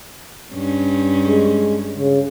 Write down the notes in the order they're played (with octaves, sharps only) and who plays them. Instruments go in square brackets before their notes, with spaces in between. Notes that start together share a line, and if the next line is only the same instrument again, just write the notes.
[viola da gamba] G2 C#4
[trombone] G#3
C#3